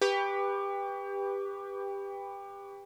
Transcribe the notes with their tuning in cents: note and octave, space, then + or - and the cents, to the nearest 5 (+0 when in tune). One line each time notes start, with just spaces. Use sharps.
G4 +20 B4 +0 C#6 +45